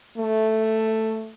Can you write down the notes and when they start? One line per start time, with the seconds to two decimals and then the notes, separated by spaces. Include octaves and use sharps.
0.17 A3